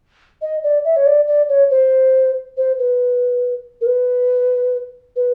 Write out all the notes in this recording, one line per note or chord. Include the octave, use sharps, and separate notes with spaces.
D#5
D5
E5
C#5
D5
D5
C#5
C5
C5
B4
A#4
B4
B4